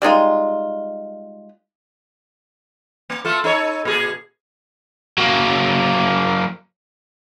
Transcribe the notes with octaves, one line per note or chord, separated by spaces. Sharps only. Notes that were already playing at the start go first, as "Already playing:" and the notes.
G3 G#3 D#4 F4
A#3
A3 F4 A4
D#4 A4 C#5
A#2 G#4 A4
F#3 A#3